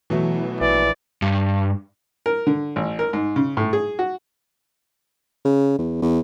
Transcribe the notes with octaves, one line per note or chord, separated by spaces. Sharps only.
B2 E3 F#3 A3
A#1 E3 D5
G2
A#4
D3
A1
A#4
G#2
C#3
A2
G#4
F#4
C#3
E2
E2